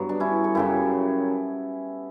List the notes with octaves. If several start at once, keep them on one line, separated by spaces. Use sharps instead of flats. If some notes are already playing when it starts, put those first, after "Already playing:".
Already playing: G2 F#3 B3
D4
C#4 E4
A4
F#2 C#3 F#3 E4 G4